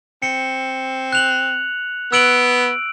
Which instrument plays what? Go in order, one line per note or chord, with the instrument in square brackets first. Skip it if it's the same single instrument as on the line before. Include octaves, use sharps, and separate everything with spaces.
[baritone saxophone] C4 [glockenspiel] C#7
[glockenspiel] F#6 F7 F#7
[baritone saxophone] B3 [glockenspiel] E6 D7 F#7